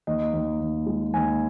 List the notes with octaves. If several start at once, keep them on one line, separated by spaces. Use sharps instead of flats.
D#2 D#5
D#2
D#2
G#3
D#2 G#5